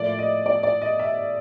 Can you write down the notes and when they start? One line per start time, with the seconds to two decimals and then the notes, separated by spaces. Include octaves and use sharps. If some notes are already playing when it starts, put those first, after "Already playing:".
Already playing: A2 F3 A#3 D5
0.19 D#5
0.46 D5
0.63 D5
0.82 D#5
0.99 E5